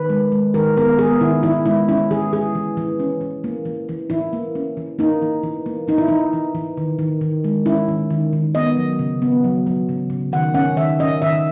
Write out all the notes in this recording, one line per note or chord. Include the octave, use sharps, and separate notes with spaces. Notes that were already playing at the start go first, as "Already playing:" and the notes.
Already playing: D#3 B4
G#3
G#3
D#3 A#4
B3 A#4
B3 G#4
D#3 E4
E3 E4
G#3 E4
C#4 E4
E3 G#4
E3 G#4
E3
E3
C#4
E3
A#3
E3
E3
E3 E4
A#3
C#4
E3
A#3 D#4
E3
E3
A#3
E3 D#4
E4
E3 D#4
E3
E3
D#3
D#3
D#3
G#3
C#4 E4
D#3
D#3
D#3
B3 D#5
F#3
C#3
B3
F#3
F#3
C#3
C#3
D#3 F#5
C#4 F#5
D#3 E5
C#4 D#5
D#3 E5